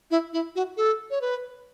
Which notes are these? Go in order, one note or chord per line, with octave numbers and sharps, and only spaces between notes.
E4
E4
F#4
A4
C#5
B4